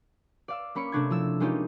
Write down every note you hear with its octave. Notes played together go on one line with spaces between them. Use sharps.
D5 F5 E6
A#3 C#4 B5 C#6 D6 C#7
C3 A3 C4 D4 C#6 G#6
F3 E4 E6
G#3 A#3 C#4 D#4 F4 G4